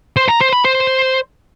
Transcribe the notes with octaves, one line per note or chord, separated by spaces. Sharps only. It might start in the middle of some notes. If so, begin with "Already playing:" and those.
C5
A#5
C5
B5
C5